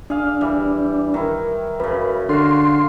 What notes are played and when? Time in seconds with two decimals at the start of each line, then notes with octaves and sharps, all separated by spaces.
0.10 D4 G#4 F5
0.41 E3 G3
1.14 D#3 E4
1.80 F#2 C#3 B4
2.29 D3 F4 F#4 C6